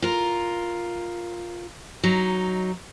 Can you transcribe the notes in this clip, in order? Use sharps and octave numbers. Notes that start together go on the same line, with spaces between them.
F4 A#4
F#3 D#4